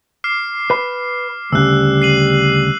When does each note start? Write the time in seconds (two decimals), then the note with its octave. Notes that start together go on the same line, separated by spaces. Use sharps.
0.24 D6 F6 C7
0.70 B4 B5
1.52 D2 A#2 C#3 G3 E6 F#6
2.02 C7 D#7 F#7